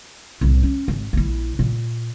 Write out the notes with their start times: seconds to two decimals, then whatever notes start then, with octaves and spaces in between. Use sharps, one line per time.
0.41 C2 A2
0.63 C#4
0.88 G#1
1.13 A#1 E4
1.59 A#2